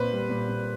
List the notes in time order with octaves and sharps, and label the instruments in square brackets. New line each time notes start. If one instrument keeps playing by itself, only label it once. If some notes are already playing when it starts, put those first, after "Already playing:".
Already playing: [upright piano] A#2 C4 [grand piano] B4 C5
[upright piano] G3
A#2
A#2